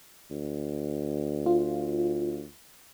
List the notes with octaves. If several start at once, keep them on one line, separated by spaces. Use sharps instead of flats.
D2
F4